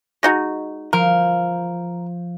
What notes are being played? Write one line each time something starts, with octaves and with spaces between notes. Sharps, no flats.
G#3 D#4 F#4
F3 A#4